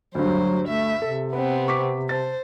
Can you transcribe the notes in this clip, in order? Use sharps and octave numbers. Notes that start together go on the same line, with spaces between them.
D2 G2 F#3 C5
A3 E5
C3 A4
B3 C4 B4
C#6 D6 B6
C5 A5 A6